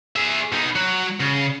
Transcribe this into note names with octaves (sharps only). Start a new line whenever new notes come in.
G#4 E5
B2 D#4
F#3 F#4
C#3